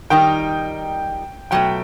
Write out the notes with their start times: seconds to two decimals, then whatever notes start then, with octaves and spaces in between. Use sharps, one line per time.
0.10 D#3 G3 D#4 G5
1.51 B2 F#3 A3 G5